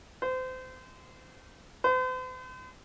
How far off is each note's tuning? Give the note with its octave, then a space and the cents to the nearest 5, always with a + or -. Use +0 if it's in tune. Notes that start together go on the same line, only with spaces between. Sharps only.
C5 -30
C5 -45